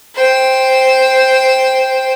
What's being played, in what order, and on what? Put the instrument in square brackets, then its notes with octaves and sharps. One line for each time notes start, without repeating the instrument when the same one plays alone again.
[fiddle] C5 G5